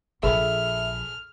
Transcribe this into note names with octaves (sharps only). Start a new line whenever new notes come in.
A#1 G#4 A4 E5 B5 F6